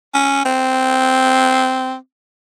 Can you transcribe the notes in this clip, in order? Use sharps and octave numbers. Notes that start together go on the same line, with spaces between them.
C#4
C4